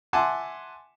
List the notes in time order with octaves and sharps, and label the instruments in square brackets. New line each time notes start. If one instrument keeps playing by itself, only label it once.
[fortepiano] E5 F#5 G#5 A5 C6 D6